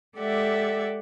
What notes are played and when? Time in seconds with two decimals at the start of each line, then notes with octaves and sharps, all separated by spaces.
0.18 G#3 G4 A4 D5 E5 F#5